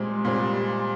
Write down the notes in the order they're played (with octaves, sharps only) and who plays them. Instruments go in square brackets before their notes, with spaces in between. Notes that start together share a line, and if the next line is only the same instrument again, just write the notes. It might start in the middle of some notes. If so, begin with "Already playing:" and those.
Already playing: [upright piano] A#2 G3 C4 [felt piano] G#3
[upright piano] A#2 G3 C4